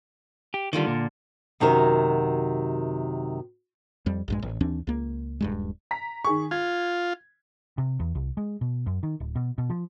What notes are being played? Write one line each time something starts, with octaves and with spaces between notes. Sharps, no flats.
G4
D3 D#3 G3 F4 D6
A#2
F#2 C3 D#3 F#4 A#4
F2 G3
A#1 G2 G#3
A1
D#2 E3 C4 D4
C#2 A#3
D#1 G2 G#3
A#5 B6
D#3 G#4 C#6
F4 G#6
C3
E2
C2
G#3
B2
F#2
D#3
D1
B2
B2
F3